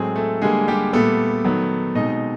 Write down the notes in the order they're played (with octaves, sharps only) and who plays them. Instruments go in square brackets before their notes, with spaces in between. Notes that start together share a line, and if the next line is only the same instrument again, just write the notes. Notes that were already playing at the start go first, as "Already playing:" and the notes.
Already playing: [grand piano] A2 F#3 G#3 A3 C4 G#4
A3 A4
D3 G3 G#3 A#3 G#4
G3 G4
A#2 G3 A3 B3 A4
D#3 F#3 B3
B2 G#3 C4 D#4 D#5